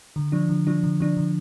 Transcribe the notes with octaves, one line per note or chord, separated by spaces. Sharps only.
D3
F3 D4
D3
F3 D4
D3
F3 D4
D3